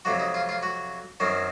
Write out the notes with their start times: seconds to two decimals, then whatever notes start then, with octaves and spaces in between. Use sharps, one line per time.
0.05 F2 C3 F#3 F#4
0.19 D#4
0.34 F4
0.49 F4
0.63 F#4
1.20 F#2 D#3 F#3 C4